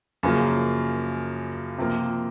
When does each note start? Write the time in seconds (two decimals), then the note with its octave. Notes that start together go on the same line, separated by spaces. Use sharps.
0.23 F#2 C#3 F3 A#3
1.78 C3 F3 A#3